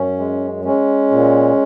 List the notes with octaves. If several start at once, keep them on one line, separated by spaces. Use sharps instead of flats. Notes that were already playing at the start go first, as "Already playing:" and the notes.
Already playing: F#2 C#4
G#3
G#3 C#4
A#2